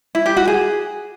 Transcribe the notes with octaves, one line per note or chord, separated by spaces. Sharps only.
E4
G4
F#4
G#4